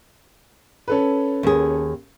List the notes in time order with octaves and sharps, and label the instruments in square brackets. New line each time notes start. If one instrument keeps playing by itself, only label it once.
[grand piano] C#4 A4 B4
[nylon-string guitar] D#2 G#4